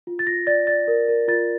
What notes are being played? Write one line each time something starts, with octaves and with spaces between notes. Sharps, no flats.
F4
A6
F4 A#6
D5 A6
D5 A6
A#4
A#4
F4 A6